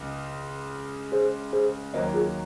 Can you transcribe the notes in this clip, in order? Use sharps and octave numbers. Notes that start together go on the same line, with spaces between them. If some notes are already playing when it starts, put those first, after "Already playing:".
Already playing: C#2 C#3
G#4 C5
G#4 C5
D#2 D#3 F#3 A#3 C5 D#5
F4 G#4